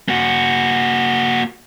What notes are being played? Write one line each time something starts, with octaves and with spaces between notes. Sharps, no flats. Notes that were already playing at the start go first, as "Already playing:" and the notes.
A#3 F#4